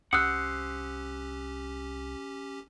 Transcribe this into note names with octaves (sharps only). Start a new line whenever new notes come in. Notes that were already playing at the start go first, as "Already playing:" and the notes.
C2 C#4 G4 C5 F#5 D#6 E6 F#6